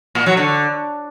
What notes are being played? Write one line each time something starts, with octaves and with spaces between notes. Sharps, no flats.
A#2
F#3
D3